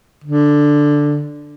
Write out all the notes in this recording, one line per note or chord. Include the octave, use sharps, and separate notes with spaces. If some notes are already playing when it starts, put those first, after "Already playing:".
D3